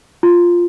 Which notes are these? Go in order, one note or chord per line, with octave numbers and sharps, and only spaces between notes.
F4